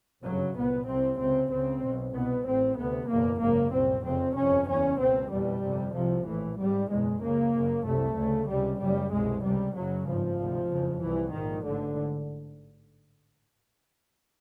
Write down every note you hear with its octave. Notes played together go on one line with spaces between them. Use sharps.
G1 F#2 C#3 F#3
C2 A#2 B3
C2 C3 C4
C#2 C3 C4
C#2 C#3 C4
B2
B1
C2 B2 B3
A1 A2 C4
D2 C3 B3
F#1 E2 B2 A#3
G#1 F#2 C#3 A#3
C2 A#2 C4
F1 F2 C#3 C4
G1 F2 C3 C#4
F#1 E2 C#3 C#4
C#2 B2 C4
F1 E2 B2 G3
G1 F2 C3
C2 C3 F3
A#1 A2 E3
G#1 G#2 G3
F#1 E2 B2 G#3
C#2 C#3 A#3
F#1 F#2 C#3
C2 C3 A3
D2 C#3
C#2 C3 G3
F#1 F#2 C#3 G3
C2 B2 G#3
C#2 C3 G3
F#1 F#2 C#3 F#3
G#1 G2 F3
D2 C3
F#1 F2 C#3
C2 C3 E3
A#1 G#2 D#3
A1 G#2 D3